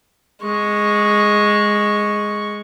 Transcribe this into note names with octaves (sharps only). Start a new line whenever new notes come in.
G#3 C#6